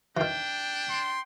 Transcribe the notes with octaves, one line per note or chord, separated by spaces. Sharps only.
D#3 E3 D4 G5
C6